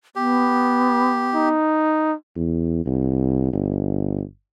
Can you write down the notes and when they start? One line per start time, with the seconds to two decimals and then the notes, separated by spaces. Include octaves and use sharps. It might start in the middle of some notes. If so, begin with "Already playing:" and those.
0.15 B3 G4
1.35 D#4
2.36 E2
2.86 C2
3.53 G1